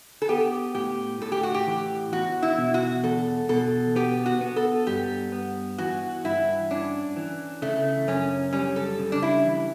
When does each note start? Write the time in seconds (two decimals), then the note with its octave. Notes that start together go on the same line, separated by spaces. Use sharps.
0.22 A4
0.29 B3 G4
0.75 A2 G4
1.21 A2 A4
1.32 G4
1.43 F#4
1.54 G4
1.67 E3
2.12 E2 F#4
2.42 E4
2.58 B2
2.74 F#4
3.03 E2 A4
3.49 B2 A4
3.96 B3 G4
4.26 F#4
4.41 B3
4.56 A4
4.87 G2 G4
5.32 B3
5.78 E3 F#4
6.24 G2 E4
6.71 C#4 D4
7.16 E3
7.62 C#3 A3
8.07 F#2 C#4
8.53 G3 C#4
8.76 A4
8.99 C#3
9.12 D4
9.22 E4
9.45 E3